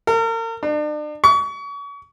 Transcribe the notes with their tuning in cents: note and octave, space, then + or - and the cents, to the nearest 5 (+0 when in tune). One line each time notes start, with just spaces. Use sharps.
A#4 -40
D4 +40
C#6 +35